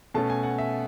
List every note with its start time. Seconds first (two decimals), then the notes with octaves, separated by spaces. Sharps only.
0.14 B2 A3 C#4 A5
0.30 G#5
0.43 F#5
0.58 E5